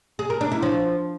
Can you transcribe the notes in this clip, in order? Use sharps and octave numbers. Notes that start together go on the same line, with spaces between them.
G#4
A#4
D4
E4
F3